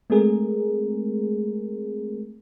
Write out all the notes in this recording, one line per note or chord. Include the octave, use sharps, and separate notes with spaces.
G#3 A3 C4 G#4 A#4